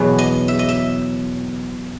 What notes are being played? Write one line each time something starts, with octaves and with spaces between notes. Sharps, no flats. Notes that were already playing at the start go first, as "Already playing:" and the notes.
Already playing: E2 B2 F#3
D#5
E5
D#5
E5